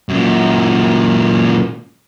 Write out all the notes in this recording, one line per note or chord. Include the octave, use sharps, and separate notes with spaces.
F#2 A#2